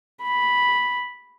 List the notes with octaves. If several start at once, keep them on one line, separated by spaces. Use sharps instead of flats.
B5